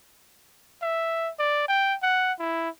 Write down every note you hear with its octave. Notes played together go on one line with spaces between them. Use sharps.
E5
D5
G5
F#5
E4